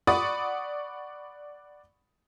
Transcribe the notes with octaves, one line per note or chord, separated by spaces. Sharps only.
D5 F#5 B5 C#6 D#6 A6